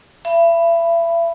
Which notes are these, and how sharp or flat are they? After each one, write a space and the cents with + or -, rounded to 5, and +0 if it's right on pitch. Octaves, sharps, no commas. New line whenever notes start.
E5 +35 B5 +0